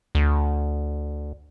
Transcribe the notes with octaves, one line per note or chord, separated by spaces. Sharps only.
D2